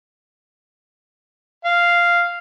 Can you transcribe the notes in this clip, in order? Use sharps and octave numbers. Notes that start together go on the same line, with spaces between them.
F5